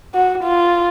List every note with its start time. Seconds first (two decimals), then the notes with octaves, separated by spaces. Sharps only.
0.14 F#4
0.44 F4